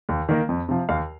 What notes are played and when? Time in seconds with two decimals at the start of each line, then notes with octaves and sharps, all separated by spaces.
0.09 D#2
0.29 D#3 A#3
0.49 F2
0.69 C3 F3
0.89 D#2 F5